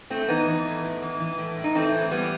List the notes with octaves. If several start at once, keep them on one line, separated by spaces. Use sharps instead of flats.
A2 A3 C4
E3 B3 D#4
E3
A2
A2
E3
E3
A2
A2
D#4
E3 A3 C4
E3
C4
A2 G3 B3